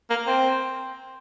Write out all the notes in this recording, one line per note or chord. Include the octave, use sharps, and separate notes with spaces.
A#3
C4